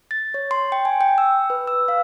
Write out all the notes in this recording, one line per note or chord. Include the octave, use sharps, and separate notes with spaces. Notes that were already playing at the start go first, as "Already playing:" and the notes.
A6
C#5
C6
G5
G#5
G5
E6
B4
E6
F5